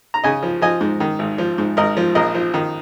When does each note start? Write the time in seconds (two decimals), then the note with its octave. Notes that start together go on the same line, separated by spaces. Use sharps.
0.14 A#5
0.24 C#3 D#5 G#5
0.43 F3
0.62 F3 D#5 G#5
0.81 G#2
1.00 D#3
1.19 G#1
1.38 F3
1.58 G#2
1.77 G#1 A#4 D#5
1.97 F3
2.15 A#1 A#4 D#5
2.34 F3
2.54 D#3